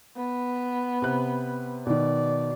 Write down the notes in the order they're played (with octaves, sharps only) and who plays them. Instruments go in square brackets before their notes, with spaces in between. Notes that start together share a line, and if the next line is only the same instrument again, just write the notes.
[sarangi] B3
[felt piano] C3 F#6
[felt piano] B2 D#3 [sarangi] D5